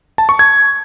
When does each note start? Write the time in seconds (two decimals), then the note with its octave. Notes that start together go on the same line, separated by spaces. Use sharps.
0.18 A5
0.29 C#6
0.39 G#6